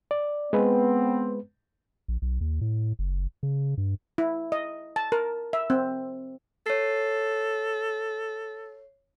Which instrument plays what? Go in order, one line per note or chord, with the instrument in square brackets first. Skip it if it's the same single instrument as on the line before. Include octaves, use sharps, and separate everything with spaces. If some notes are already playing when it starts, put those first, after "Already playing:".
[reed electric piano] D5
[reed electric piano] G#3 B4 [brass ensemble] B3 C4
[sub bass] A#1
B1
D#2
A2
F#1
C#3
G2
[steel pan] E4
D#5
A5
A#4
E5
C4
[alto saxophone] A4 [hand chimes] C#5 C7